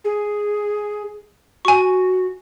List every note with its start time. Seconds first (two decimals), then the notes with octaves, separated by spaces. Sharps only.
0.05 G#4
1.65 F#4 G#5 C#6